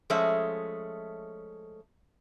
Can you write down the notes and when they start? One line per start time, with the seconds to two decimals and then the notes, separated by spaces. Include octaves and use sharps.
0.10 F3 G#3 A3 C#4 E5